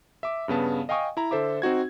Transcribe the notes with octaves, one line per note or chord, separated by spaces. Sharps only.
E5 D6
G2 C#3 B3 A5
D#5 F5 G5 G#5 C#6 D#6
E4 A#5
D3 A4 C5 E5 D6
C4 D#4 F#4 G#6